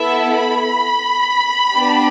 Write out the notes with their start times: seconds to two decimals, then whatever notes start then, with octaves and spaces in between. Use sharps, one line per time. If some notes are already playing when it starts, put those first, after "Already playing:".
Already playing: B3 E4 A4 E5
0.37 B5
1.73 B3 D4 G4